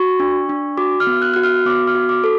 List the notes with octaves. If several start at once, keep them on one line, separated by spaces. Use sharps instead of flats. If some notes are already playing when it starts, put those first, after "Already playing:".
Already playing: F#4 C#6
D4
D4
F#4 D6
F6
B3
F#6
F#4 F#6
F6
B3 D6
F6
F#4
D6
A4